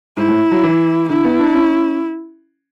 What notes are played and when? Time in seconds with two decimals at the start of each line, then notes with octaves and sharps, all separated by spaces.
0.17 G#2 E4
0.28 A2
0.51 F#3
0.63 E3
1.09 D3 E4
1.24 B3
1.39 D4
1.54 C#4